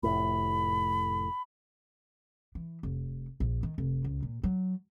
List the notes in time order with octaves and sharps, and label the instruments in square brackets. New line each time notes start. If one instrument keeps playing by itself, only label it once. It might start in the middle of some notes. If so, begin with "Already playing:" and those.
[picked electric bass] F1 A2 [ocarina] B5
[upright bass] E3
F1
A#1
D#3
F1
C#2
A#2
F#3